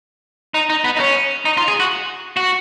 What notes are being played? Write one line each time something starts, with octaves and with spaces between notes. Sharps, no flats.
D#4
D#4
B3
D#4
C#4
D#4
F4
G#4
F#4
F#4